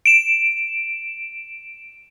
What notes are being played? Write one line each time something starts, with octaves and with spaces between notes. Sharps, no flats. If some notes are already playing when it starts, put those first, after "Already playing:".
D7 E7